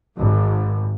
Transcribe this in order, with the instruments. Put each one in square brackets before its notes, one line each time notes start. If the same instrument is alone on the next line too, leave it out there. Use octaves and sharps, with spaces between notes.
[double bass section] G#1